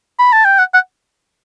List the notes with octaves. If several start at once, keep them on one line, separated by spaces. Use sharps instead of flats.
B5
A5
G5
F#5
F#5